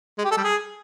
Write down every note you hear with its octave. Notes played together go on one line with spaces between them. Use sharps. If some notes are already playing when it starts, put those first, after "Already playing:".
G#3
G4
A4
G3
G#4